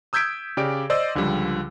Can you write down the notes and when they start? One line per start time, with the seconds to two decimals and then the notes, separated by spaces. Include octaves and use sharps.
0.13 D#6 E6 G6 G#6 B6 D7
0.57 C#3 G4 D5 D7
0.90 C5 D5 D#5 E6
1.15 C#2 D3 F3 G3